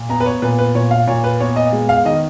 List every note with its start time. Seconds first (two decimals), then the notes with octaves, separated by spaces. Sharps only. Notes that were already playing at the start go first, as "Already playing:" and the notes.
Already playing: A#2
0.09 B3 A#5
0.20 B4
0.26 C#5
0.42 A#2 B4
0.59 B4
0.75 A#2 C#5
0.91 F5
1.07 A#2 C#5
1.24 B4
1.40 B3 C#5
1.56 D#5
1.72 G#3
1.89 F5
2.05 D#3 D#5